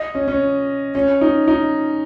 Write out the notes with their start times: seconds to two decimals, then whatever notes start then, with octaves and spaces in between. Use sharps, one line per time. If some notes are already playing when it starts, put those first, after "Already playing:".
Already playing: D#5
0.15 C#4
0.28 C#4
0.95 C#4
1.21 D#4
1.48 D#4